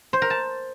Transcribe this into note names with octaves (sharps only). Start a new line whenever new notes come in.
C5
A#4
A5